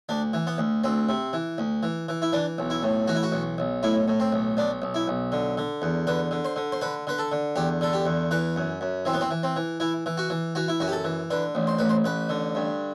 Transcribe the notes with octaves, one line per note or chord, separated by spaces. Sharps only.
D2 D4
E3
B3
D2
D2 C4
C3
E3
D2
E3
E3
E4
E3 D4
B1
E4
A2
E3 F#4
E4
F#4
B1
B1
A2 E4
A2
C4
B1
B1 D4
B1
E4
B1
D3
D3
E2
D3 B4
D3
C5
D3
C5
D3 B4
D3 B4
A4
D3
E2 G4
D3 A4
G4
E2
E3 B4
F#2
F#2
E3 C4
B3
C4
E3
C4
E3
E3 E4
E3
F#4
E3
E3 F#4
E4
F#2 F#4
G4
A4
E3
D3 B4
A1
C5
A1 B4
C5
A1 B4
D3
G2